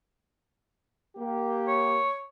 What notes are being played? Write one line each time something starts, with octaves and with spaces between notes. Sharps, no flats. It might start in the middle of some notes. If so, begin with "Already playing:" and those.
A#3 G4
C#5